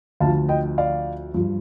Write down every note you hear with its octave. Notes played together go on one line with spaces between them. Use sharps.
D2 D3 F3 F5 A5
D#5 G5
D5 F5
G2 F3